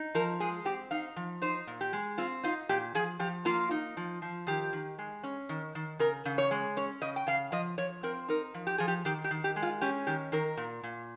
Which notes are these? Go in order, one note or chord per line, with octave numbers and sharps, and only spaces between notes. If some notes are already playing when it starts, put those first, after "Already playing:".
Already playing: D#4
F3 A#4
G#3 G#4
C4 G4
D#4 F5
F3
D#4 C5
A#2
G4
G#3
C4 F4
D#4 F4
A#2 G4
F3 G#4
F3 G4
A#3 F4
D#4
F3
F3
D#3 G4
D#3
G#3
C#4
D#3
D#3
C#3 A#4
C#3
C#5
G#3
C#4 C#5
C#3 D#5
G5
C#3 F5
F3 D#5
F3 C#5
C4 A#4
D#4 A#4
F3
G4
F3 G#4
G4
D#3 G4
G4
D#3
G4
G#3
F4
C#4 G4
D#3 G4
D#3 A#4
A#2
A#2